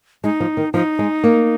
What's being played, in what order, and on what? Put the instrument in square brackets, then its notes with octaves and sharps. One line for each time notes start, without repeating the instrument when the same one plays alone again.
[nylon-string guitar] G#3 [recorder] D#4
[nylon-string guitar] F3
D#3
[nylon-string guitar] F3 [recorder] D#4
[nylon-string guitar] G#3
A#3